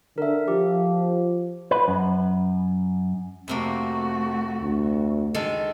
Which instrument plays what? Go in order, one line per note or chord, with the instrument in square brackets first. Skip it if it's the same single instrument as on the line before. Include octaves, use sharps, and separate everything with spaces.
[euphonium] D3 [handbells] A#4 E5
[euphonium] F3 [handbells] G4
[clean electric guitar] B4
F#2
[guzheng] F2 C3 A#3 [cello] A3 F#4
[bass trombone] D2
[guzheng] D#3 G#3 A4